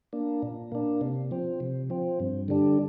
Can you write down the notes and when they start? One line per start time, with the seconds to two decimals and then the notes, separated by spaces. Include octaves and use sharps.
0.13 A#3 D4
0.42 A#2
0.72 A#3 D4
1.01 C3
1.31 F3 C4
1.60 C3
1.90 F3 C4
2.20 G2
2.48 D3 G3 D4